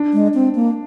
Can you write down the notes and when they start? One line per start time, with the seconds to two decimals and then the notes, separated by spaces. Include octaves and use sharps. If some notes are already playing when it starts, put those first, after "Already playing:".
Already playing: D4
0.13 G#3
0.34 C4
0.55 A#3